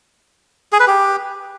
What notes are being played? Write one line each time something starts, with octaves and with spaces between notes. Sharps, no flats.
G#4
B4
G4